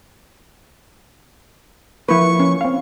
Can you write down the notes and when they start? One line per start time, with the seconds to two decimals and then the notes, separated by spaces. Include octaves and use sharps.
2.09 F3 A#3 E4 B4 C#6
2.39 C#4
2.61 C4 F5